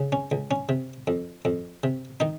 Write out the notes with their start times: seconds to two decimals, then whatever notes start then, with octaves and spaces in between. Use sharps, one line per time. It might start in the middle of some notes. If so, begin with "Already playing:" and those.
Already playing: C#3
0.12 C#4
0.32 C#2
0.51 C#4
0.69 C3
1.07 F2
1.45 F2
1.84 C3
2.20 D#3 D#4